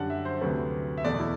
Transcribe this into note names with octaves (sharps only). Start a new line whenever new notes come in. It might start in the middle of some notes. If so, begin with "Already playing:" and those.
Already playing: F#2 D3 G3 F#5 A5
E5
C5
D2 C3 F#3 A3 B4
E5
E2 B2 A3 D5
E4